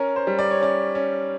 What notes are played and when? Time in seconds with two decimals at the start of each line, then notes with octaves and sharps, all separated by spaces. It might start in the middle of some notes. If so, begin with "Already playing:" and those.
Already playing: C#4 A#4
0.16 C5
0.27 G3
0.39 D5
0.51 C#5
0.60 C#4 D5
0.95 C#4